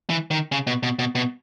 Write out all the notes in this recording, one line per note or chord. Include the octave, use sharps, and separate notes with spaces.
E3
D#3
C#3
B2
B2
B2
B2